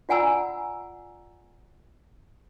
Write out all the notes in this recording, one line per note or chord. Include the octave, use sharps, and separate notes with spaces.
F4 D5 F#5 G#5 A#5 E6